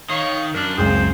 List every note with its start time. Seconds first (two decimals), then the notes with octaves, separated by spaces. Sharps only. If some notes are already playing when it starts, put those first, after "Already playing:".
0.10 D#3 C#5 F5 D#6
0.54 F#2 D4 A#4
0.78 F#1 C#2 C4 C#4 G#4 C5